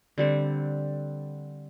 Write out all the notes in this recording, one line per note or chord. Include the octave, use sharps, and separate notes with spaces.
D3 G3 C4